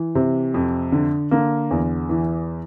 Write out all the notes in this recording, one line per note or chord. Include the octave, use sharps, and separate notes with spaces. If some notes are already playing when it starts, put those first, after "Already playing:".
Already playing: E3
C3
F2
D3
D3 A#3
E2
E3